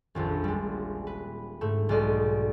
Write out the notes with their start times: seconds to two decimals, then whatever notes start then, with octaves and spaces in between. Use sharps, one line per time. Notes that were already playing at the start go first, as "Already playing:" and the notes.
0.15 D#1 A#1 F2
0.44 G3 G#3
1.07 B4
1.61 G#2 A3
1.89 B1 G#3 D5 D#5